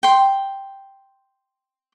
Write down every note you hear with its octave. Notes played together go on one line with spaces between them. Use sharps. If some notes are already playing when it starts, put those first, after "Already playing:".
G5 C6